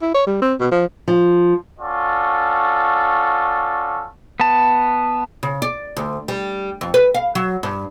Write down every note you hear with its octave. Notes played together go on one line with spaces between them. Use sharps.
E4
C#5
G3
C4
B2
F3
F3
C#4 F4 F#4 A4 D5
B3 A5
C#3
D5
D2
G3
F2
B4
F5
F#3
G2